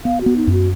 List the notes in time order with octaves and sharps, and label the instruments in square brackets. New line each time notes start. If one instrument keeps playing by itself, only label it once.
[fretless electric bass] B3 [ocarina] F5
[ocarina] F#4
[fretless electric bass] B3
[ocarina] D#4
[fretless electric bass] F#2 [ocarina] F#4